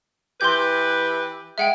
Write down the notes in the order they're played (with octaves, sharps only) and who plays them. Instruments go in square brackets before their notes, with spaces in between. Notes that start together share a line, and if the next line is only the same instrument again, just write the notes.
[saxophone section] E3 G4 B4 [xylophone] C6 G6
[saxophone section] G#3 [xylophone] E5 F#5 G5